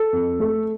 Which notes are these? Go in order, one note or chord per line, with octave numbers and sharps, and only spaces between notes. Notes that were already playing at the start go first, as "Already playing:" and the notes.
Already playing: A4
F2
A3